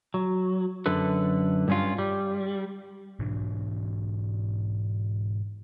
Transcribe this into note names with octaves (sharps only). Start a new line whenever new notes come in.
F#3
F#2 D3 A4 B4
G2 C#4 F4
G3
G#2 B2 E3 D4